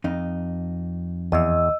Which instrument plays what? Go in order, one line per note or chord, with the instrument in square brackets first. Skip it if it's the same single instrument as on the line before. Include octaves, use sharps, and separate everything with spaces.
[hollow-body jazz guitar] F2 D#4
[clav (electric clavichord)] E2 [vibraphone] D#5 E6